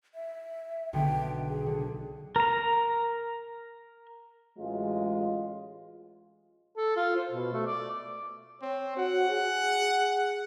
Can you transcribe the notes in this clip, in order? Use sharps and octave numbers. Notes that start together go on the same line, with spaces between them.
E5
B1 D3 B3 G5
G#4
D3
A#4 A#5
A1 F#3 G#3 F4
A4
F4
C5
B2
A3
D5
C4 C#5
F#4 F#5
G#4